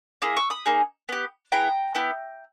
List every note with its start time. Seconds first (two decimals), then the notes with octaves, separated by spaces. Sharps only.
0.22 A#3 E4 G#4 D#6
0.37 C#6 E6
0.50 B5 D#6
0.66 A#3 D#4 G#4
1.09 B3 G4
1.52 B3 E4 G#4 G5 A#5
1.95 B3 E4 G4